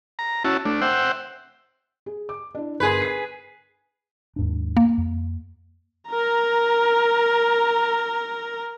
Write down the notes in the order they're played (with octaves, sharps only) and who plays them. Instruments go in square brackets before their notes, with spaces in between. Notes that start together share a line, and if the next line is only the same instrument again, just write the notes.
[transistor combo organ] A#5
C#4 E4 F#4 A5
A3 D4
C5 E5 F#5 G5
[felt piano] G#4
D6
D4 E4
[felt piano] G1 A#4 C6 [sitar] G#4 B4
[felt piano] G#6 C7
[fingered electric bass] D#2 G#2 D4
[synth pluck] A#3
[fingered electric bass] F2
[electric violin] A#4 A#5